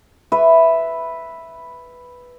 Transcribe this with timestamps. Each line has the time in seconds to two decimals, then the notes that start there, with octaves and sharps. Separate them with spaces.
0.32 B4 E5